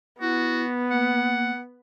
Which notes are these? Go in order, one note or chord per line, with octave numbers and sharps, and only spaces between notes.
B3 E4 F#4
A#3 F#5